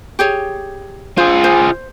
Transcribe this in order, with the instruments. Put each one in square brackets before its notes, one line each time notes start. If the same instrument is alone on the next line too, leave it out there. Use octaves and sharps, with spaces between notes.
[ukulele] G4 G#4 C#5
[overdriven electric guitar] F4 G#4 [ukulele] C5
[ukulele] C5